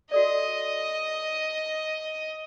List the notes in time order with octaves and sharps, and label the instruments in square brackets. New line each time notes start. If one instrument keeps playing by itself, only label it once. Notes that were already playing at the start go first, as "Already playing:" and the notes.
[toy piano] F#4 A4 D5 [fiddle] D#5